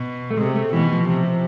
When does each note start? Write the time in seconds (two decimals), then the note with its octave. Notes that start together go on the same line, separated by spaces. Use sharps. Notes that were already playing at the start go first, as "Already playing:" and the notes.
Already playing: B2
0.31 A3
0.37 C3 G#3
0.56 A3
0.73 B2 E3
0.92 F3
1.09 C3